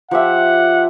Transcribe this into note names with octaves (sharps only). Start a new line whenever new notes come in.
F3 G4 E5 F#5